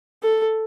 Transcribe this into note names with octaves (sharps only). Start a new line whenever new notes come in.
A4